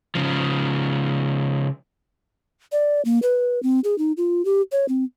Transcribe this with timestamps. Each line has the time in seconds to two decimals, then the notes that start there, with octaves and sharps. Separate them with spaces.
0.15 C#3 F3
2.72 D5
3.05 A#3
3.22 B4
3.63 C4
3.84 G#4
3.98 D#4
4.17 F4
4.45 G4
4.72 C#5
4.88 C4